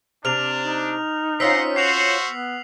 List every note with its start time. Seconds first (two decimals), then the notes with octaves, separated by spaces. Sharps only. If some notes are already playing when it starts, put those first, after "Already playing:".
0.25 C3 D4 F6 F7
0.64 D#4
1.40 C4 C#4 F4 F#5 A#5 C6 E6 B6
1.76 F#4 C5 C7 F7 F#7
2.29 B3